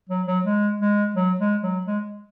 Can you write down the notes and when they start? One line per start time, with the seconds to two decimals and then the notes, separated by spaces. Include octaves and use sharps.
0.09 F#3
0.27 F#3
0.45 G#3
0.80 G#3
1.15 F#3
1.40 G#3
1.63 F#3
1.86 G#3